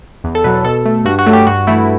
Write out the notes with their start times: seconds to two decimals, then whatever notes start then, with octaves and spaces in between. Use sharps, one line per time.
0.24 E2
0.35 A4
0.44 B2 F#3 B4
0.65 B2 A4
0.86 A3
1.05 G2 F#4
1.19 F#4
1.26 F#3 A3
1.33 G4
1.47 G2 F#4
1.67 E3 A3 E4